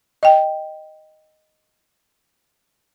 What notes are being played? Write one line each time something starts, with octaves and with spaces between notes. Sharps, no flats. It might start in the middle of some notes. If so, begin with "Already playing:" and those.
D#5 G5